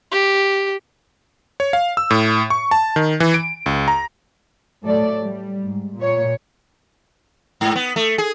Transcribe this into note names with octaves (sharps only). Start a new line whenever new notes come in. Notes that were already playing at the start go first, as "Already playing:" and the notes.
G4
C#5
F5
E6
A2
C#6
A5
D#3
E3
D7
C#2
A#5
A2 F#3 A3 A4 D5
G3
G#2
A#2 C#5
G#2
B3
A3
G#4